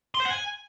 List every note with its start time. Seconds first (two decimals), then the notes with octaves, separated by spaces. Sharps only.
0.15 C6
0.20 C5
0.25 F#5
0.30 G#5